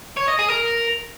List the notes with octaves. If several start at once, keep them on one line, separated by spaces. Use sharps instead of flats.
C#5
D#5
G#4
A#4